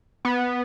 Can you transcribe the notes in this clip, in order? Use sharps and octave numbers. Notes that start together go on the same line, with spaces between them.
B3